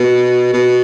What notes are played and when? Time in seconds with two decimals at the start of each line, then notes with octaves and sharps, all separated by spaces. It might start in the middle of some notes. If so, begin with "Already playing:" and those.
Already playing: B2
0.54 B2